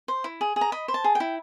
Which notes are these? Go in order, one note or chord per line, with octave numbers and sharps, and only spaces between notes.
C5
E4
G#4
G#4
A#5
D#5 B5
C5
A5
G#4
G5
E4